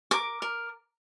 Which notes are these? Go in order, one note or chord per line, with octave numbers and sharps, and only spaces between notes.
A#4 D6
A#4